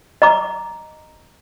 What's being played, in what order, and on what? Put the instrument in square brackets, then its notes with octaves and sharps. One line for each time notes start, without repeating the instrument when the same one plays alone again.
[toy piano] D#5 A#5 D6